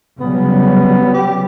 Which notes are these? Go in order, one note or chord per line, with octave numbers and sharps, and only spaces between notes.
C#3 F#3 G3 B3
G4